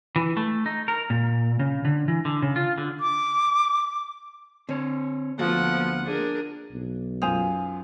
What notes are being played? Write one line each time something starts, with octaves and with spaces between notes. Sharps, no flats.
E3
A3
D#4
A#4
A#2
C#3
D3
E3
D3
C#3
F4
D3
D6
D3 C4 C#5
D2 F3 A#3 B3 F#4 A4 F#5
D4 G#4 A#4
B1
F#2 F4 C5 G#5 D#6 F7